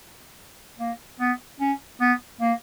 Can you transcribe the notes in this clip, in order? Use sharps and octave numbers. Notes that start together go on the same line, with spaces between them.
A#3
B3
C#4
B3
A#3